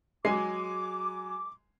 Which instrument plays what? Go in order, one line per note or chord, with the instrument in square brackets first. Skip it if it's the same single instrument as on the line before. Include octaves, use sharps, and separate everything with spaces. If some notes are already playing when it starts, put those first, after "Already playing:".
[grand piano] F#3 G#5 C7 [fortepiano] G#3 [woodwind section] D6